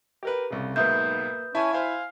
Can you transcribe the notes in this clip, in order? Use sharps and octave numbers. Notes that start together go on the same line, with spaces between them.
G4 A#4 B4
C2 C#3
B1 G#2 A#3 B4 E5 D#6 G6
C#4 E4 E5 G#5 A5
C5 F5 G#5